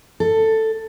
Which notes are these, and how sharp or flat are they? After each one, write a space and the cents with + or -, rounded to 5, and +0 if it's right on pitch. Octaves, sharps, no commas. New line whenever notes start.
A4 +10